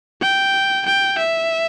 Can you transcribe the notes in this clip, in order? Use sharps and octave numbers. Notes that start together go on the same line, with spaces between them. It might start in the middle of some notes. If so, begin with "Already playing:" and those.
G5
G5
E5